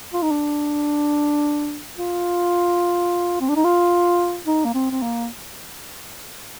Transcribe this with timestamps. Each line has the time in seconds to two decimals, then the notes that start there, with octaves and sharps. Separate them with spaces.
0.13 F4
0.22 D#4
0.31 D4
1.97 F4
3.41 C4
3.49 D4
3.56 D#4
3.65 F4
4.47 D#4
4.65 A#3
4.74 C4
4.91 C4
5.02 A#3